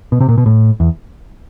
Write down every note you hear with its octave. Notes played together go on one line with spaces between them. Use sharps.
B2
C3
A#2
B2
A2
E2